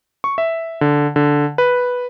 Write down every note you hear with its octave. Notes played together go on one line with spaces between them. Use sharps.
C#6
E5
D3
D3
B4